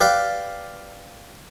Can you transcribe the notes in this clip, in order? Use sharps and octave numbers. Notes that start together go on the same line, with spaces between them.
G4 B4 D5 F5